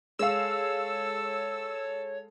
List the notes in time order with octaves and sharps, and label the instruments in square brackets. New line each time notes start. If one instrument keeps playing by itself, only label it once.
[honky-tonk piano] G#3 F5 [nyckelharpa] A4 [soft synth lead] C#5 [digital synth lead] E6